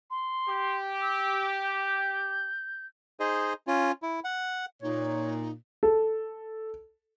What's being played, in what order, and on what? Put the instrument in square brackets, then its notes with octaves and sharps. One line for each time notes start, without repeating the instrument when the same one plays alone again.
[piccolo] C6
[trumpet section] G4
[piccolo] E6
G6
[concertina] D#4 G#4 C5 D#5
C#4 F4
E4
F#5
[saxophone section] A#2 [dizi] D#4 [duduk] C#5
[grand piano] A4